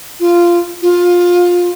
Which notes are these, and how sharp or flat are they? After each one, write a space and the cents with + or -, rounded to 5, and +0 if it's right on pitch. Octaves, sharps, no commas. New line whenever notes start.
F4 -10
F4 +20